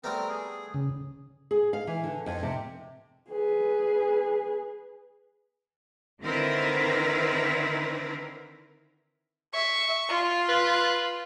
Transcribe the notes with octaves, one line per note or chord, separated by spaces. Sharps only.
G3 A3 B3 C4 A#4
G#4
C#3
G#4
F5
E3
D3
F2
C3
G#4 B4
D3 D#3 C4 E4 A#4 B4
E5 C#6
F4
B4